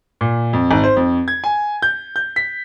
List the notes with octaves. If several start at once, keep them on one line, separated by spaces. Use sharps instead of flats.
A#2
F2
G#1
C5
F2
G#6
G#5
G6
G6
B6